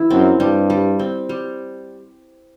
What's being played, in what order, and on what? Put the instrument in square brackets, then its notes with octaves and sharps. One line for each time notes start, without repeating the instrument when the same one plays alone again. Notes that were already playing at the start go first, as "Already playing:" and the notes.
Already playing: [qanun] E3 E4
[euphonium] F#2 [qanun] C4
[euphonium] G2 [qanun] G3
[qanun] G3
C4
G3